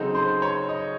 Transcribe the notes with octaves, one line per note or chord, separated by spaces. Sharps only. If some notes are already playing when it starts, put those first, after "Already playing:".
Already playing: C#3 F#3 C4 D#4 A4
C5
C#5
D#5